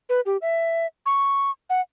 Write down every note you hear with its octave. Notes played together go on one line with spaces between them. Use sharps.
B4
G4
E5
C#6
F#5